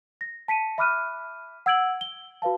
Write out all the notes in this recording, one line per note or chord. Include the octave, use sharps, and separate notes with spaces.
A#6
A5 B6 C#7 D#7
E5 B5 D6 F6 F#6 D#7
F#5 E6 G#6 D7 F#7
G7
F#4 B4 F5 A5